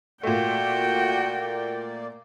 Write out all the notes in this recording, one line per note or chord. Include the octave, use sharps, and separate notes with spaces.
A#2 A3 A#3 F#4 D5 G5